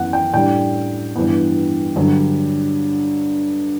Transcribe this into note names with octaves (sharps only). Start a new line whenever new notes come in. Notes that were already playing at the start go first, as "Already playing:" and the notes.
Already playing: F#2 E3 B3 F#5
G5
A2 G3 D4 G5
G2 E3 B3
G2 D3 F#3